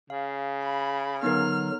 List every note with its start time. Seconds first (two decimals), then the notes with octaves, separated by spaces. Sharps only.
0.10 C#3 F5
0.63 B5
1.23 D3 F#3 B3 D#4 A#4 F6